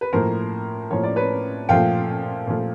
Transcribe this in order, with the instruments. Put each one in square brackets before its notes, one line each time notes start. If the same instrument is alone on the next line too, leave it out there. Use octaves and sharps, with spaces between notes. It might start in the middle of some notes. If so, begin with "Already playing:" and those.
[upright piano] B4
A2 F3 A#3 A#4 C5
A2 F3 A#3 C#5
D5
B4 C#5
A#2 F3 A3 F5 G5
A#2 F3 A3